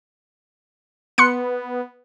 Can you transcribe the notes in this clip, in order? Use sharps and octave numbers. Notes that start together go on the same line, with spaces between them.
B3 C6 F#6 C#7